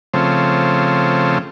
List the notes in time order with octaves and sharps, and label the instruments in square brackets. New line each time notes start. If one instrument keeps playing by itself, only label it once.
[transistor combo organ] C#3 F3 A3 C4